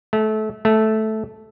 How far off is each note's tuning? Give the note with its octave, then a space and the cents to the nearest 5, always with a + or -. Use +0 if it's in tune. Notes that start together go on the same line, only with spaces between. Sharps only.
A3 -25
A3 -10